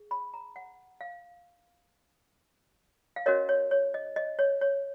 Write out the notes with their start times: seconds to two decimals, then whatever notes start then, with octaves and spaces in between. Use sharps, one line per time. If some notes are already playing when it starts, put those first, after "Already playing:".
Already playing: G#4
0.11 B5
0.34 A#5
0.56 F#5
1.01 F5
3.16 F5
3.26 C#4 F#4 A#4 C#5 D#5
3.49 C#5
3.71 C#5
3.94 D#5
4.16 D#5
4.39 C#5
4.61 C#5